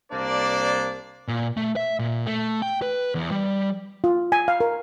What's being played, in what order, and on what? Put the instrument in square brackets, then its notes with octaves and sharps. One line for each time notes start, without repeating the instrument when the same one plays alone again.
[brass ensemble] C2 A#3 D4 C5 D5
[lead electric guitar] A#2
A3
E5
A#2
A3
G5
B4
E2
G3
[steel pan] F4
G#5
F5
A#4